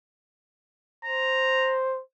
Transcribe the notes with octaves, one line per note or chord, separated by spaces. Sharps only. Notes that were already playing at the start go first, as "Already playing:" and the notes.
C5 A#5